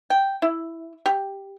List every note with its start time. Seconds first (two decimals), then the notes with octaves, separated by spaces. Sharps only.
0.10 G5
0.42 E4
1.06 G4